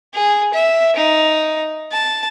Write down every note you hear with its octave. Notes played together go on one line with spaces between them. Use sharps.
G#4
E5
D#4
A5